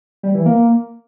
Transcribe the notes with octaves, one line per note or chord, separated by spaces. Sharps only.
G3
E3
A#3